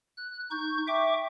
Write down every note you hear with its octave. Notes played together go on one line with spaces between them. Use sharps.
F#6
D#4 C#6 G6
E5 G5 C#6 D6